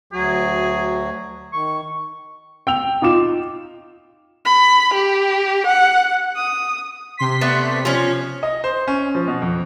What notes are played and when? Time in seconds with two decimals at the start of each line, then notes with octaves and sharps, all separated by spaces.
0.13 D2 F#3 F#4 G#4
1.53 D#3 C#6
2.67 G5 E6 F7
3.02 D#4 F4 D6 E7
4.45 B5
4.94 G4
5.67 F#5
6.36 D#6
7.17 C3 C6 B6
7.41 A3 B3 D4
7.85 F3 C#4
8.43 D#5
8.64 C5
8.88 C#4
9.15 F3
9.27 B2
9.42 F2